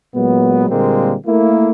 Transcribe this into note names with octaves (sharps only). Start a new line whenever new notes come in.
A#2 F#3 G#3 B3
A#2 D3 G3 G#3 A#3 C4
A3 A#3 E4